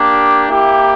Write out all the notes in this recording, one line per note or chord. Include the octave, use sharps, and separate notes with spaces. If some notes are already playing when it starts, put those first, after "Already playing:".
Already playing: A#3 D4 G4
A#3 E4 G4